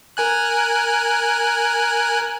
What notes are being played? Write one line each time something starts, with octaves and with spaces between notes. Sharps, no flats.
A#4 G#5 F#6